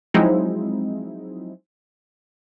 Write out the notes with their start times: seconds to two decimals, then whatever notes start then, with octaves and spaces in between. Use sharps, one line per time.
0.14 F3 F#3 G#3 C4 D#4 E4